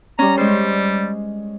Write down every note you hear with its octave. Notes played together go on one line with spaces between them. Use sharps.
G3 C#4 A#5
G3 G#3 C5